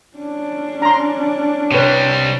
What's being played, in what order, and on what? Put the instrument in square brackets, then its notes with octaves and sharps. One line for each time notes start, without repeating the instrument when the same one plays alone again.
[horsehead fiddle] C#4 D4
[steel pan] A#5 C6
[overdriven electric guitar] C3 G3 [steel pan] B4 C#5